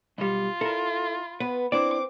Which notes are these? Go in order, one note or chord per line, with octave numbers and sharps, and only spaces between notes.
B1 G3 F4
E4 A4 A#4
B3 B4
C4 D4 E4 D5 D6